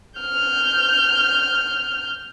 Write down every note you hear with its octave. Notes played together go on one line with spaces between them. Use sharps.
F6 G6